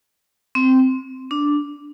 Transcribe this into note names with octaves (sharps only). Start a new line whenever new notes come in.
C4
D4